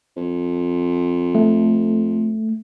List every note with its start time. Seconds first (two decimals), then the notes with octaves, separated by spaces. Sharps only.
0.16 F2
1.35 A3